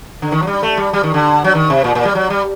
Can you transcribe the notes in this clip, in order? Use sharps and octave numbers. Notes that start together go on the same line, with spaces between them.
D3
D#3
F#3
G3
A3
G3
G3
D#3
D3
F#3
D#3
C3
A#2
A#2
G3
F#3
G3